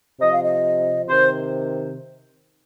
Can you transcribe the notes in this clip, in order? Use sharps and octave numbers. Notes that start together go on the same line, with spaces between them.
C3 F3 D#5
F5
D#5
C3 D#3 C5